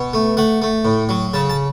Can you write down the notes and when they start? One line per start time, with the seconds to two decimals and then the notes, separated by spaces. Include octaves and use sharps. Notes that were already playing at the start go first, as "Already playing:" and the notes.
Already playing: B2
0.14 A3
0.37 A3 F#5
0.62 A3
0.85 A2
1.09 F#3
1.34 C#3 A5
1.50 A5